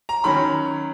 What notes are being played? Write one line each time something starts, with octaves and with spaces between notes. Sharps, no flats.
A#5
D#3 F#3 C#4 B5